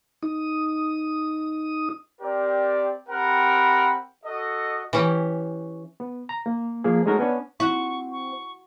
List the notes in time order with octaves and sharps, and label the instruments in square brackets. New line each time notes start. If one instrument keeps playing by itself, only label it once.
[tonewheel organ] D#4 D#6
[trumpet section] C4 G4 A#4 D5
C4 G4 A#4 F#5 B5
F#4 A4 D#5
[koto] E3 C#4 G4
[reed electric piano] B3
A#5
A#3
F3 A#3 G#4
G#3 A3 C#4 D#4 F#4 A#4
B3 C#4 D4
[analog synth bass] C4 [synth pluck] E4 [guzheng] F#4 [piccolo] C#6
[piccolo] C#6